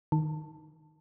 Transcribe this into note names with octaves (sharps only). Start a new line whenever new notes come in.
D#3